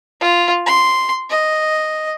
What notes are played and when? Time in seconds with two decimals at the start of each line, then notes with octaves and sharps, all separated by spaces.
0.21 F4
0.66 C6
1.30 D#5